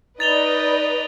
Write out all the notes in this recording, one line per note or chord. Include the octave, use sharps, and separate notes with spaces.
D#4 B4 D5 D#5 A6 F7 G7